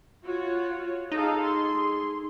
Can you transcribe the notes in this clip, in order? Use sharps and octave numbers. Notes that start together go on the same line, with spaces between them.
F4 F#4 C#5
D#4 G#4 A4 F5
G#4 C6